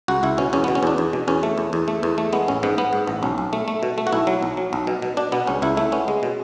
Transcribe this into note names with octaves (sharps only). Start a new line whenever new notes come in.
C#2 F#4
C#2 E4
B2 C#4
E2 C#4
B2 B3
C#4
E2 D4
E2
B2
E2 C#4
A3
E2
E2
A3
E2
A3
G#3 B3
A1 C#4
G#2 B3
B3
G#2
A1
B1 C#4
B1
A3
A3
B2
A3
F#4
B1 E4
F#3
B1
F#3
B1
B2
B2
B2 D4
B2 B3
C#2 C#4
C#2 E4
A3 E4
B3 C#4
G#3
B2